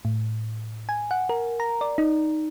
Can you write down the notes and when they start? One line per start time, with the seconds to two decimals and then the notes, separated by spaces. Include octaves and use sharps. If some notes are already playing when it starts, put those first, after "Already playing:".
0.05 A2
0.89 G#5
1.11 F#5
1.29 A#4
1.60 A#5
1.81 D5
1.98 D#4